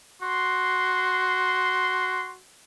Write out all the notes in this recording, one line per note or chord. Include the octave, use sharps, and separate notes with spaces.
F#4 C6